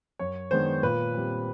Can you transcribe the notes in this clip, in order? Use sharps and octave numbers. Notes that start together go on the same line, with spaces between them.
F#2 C#5
D#3 G#3 B3 D4 C5
A#2 B4
G3 C4